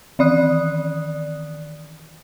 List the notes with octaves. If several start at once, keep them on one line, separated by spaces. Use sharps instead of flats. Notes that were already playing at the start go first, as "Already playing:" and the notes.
D#3 E3 D5 D#6 F#6